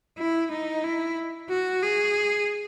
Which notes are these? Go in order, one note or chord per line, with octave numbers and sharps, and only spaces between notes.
E4
D#4
E4
F#4
G#4